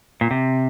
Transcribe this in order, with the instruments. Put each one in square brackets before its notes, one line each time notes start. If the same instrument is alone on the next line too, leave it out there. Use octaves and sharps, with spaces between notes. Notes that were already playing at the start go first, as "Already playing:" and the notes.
[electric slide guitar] A#2
C3